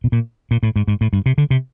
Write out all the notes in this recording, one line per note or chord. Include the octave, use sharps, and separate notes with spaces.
B2
A#2
A#2
A2
G#2
G#2
A2
G2
C3
D3
C3